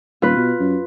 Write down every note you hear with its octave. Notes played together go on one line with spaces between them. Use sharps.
D#1 F4 B4
B2
F#2